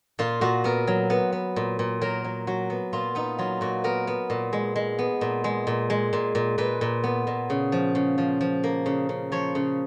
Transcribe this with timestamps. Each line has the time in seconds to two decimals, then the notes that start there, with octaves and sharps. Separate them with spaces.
0.19 A#2 F4
0.41 A#2 F#4
0.64 B3 A#4
0.88 F#3
1.10 B3 B4
1.33 B3
1.56 A#2
1.79 A#2
2.01 F#3 A#4
2.24 F#3
2.47 F#3 F#4
2.70 B3
2.93 A#2 F4
3.15 B3 D#4
3.39 F#3 F4
3.61 A#2 F#4
3.84 B3 A#4
4.07 B3
4.30 A#2
4.53 G#3
4.76 G#3
4.99 B3
5.21 A#2
5.44 G#3
5.67 A#2
5.90 G#3
6.13 A#2
6.35 A#2
6.58 A#2 B4
6.81 A#2
7.04 B3
7.27 A#2
7.50 C#3
7.72 F3
7.95 C#3
8.18 F3
8.41 F3
8.64 A#3
8.86 C#3
9.09 C#3
9.32 F3 C#5
9.55 C#3